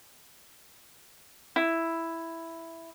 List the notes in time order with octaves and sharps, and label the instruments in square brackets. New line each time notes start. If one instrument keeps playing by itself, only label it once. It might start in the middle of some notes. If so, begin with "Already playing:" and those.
[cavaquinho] E4